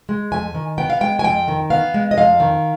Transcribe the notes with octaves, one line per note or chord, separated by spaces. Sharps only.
G#3
F2 G#5
D#3
B3 G5
F5
G#3 G5
G#5
F2 G5
D#3
B3 F5
G#3
D#5
F2 F5
D#3